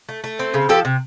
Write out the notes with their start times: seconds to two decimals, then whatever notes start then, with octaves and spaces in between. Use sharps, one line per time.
0.09 A3
0.24 A3
0.39 C4
0.54 C#3
0.69 F3 G4 A4
0.85 C3